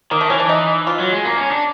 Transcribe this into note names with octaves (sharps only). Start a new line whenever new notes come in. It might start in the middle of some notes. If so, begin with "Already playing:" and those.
D#3 A#3
A3
E3 C#4
D4
D#4
F4
F#3
G#3
A#3
C#4
D4